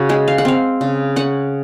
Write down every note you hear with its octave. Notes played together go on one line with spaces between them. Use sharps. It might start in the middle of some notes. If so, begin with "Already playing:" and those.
Already playing: C#3 F#4
G#3 G#4
F5
F#5
C4 F5
C#3
C#4 F#5